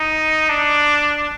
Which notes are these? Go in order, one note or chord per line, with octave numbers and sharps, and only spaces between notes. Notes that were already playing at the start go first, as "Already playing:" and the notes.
Already playing: D#4
D4